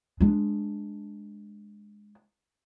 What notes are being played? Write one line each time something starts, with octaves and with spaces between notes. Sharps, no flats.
G#3 D4